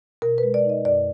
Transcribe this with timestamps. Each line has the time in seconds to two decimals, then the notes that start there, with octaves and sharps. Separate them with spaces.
0.22 B2 A#4
0.38 B4
0.43 G#3
0.54 D5
0.65 D#4 D#5
0.85 F#2 D5